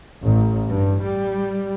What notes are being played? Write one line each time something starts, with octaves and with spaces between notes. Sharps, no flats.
A1
G2
G3